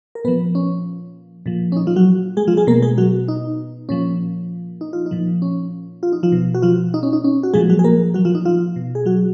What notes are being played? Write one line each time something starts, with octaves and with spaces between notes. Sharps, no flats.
A#4
A#2 F3 B3 B4
C#4
A#2 F3
C#4
D#4
F3 F4
F#3 F#4
G#3 G#4
F3 F4
G#3 G#4
B2 A#3 A#4
G#3 G#4
F#3 F#4
D#4
A#2 F3 C#4
D#4
F4
D#4
A#2 F3
C#4
F4
D#4
F3 F4
B2
F#4
F3 F4
D#4
C#4
D#4
C#4
F#4
A#2 F3 G#3 G#4
F#3 F#4
G#4
A#3 A#4
F#3 F#4
F3 F4
D#4
F3 F4
B2
G#4
F#3 F#4